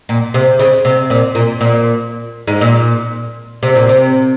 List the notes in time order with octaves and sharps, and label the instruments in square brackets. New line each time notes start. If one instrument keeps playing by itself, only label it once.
[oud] A#2
C3
C#3
C3
A#2
A#2
A#2
G#2
A#2
C3
A#2
C3